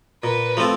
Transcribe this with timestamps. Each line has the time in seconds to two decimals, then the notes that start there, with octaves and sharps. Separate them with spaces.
0.24 A#2 B4
0.57 F3 A3 C4 F4